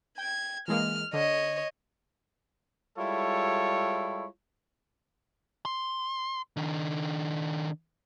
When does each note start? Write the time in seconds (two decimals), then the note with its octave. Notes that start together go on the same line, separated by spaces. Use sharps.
0.18 G5 G#6
0.68 E3 G#3 A#3 F6
1.13 D3 C#5 D#5
2.98 G3 G#3 E4 F4 A4 C#5
5.65 C6
6.57 D#3 D4